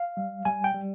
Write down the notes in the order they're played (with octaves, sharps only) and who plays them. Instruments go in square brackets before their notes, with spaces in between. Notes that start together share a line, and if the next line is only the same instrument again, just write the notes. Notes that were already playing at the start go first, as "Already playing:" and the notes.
Already playing: [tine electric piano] F5
G3
G3 G#5
G5
G3